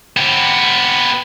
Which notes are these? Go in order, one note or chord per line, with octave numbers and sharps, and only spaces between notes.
B3 G4